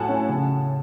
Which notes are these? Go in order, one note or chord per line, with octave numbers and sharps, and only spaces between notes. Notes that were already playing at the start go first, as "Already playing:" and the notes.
Already playing: A2 F#3 F#5 G#5 A5
C#4
C#3